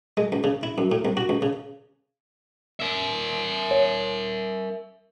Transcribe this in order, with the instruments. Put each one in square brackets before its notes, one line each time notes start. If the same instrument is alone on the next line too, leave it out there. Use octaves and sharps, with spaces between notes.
[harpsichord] G#3
C#2
C#3
E4
F#2
A2
C2
F#4
C#2
C#3
[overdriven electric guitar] A#4 E5
[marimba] C#5